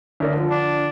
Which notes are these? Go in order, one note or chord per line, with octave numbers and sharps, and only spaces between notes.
D2 A#4 D5
D3 F3
D4